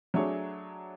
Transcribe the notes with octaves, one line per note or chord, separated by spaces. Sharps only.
F#3 A3 D4 G#4 C#5